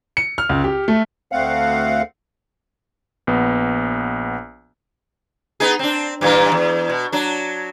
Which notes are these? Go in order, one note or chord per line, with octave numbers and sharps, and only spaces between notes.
C#7
F6
C#2
G4
A3
D2 A3 C4 F5 F#5
A#1 B3
B3 D#4 G#4
C4 D4
G2 A#2 E3
E2
B2
F#3 D4